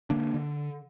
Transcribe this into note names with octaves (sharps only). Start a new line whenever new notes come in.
D3 A#3 D4
D3